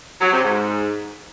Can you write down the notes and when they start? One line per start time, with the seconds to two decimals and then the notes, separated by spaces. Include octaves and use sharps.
0.21 F#3
0.33 C3
0.44 G#2